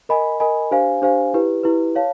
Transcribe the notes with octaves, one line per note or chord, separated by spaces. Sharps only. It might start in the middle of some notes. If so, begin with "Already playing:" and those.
A#4 D#5 G#5 B5
A#4 D#5 G#5 B5
D4 G4 C5 F5 G#5
D4 G4 C5 F5 G#5
E4 G4 B4
E4 G4 B4
C#5 F5 A5